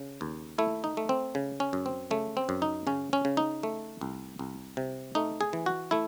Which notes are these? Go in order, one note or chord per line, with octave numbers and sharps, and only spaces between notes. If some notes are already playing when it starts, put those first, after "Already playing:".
Already playing: C#3
D#2
A3 E4
D#4
A3
C4
C#3
C#4
F#2
C4
C#3 A3
C4
F#2
D#4
C#3 C#4
C#4
C#3
D#4
A3
C2
C2
C3
A3 D#4
G#4
E3
F#4
A3 E4